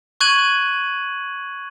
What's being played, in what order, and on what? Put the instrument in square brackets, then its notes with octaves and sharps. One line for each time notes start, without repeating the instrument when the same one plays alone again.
[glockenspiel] C#6 F#6 G#6 D#7 F#7